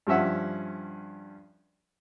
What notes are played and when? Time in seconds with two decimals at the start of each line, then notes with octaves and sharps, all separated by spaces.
0.07 G2 F3 C#4 E5 F#5